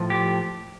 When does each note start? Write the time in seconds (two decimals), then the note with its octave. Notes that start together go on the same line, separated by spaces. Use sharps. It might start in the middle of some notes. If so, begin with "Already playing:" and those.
Already playing: A2 F3
0.10 G4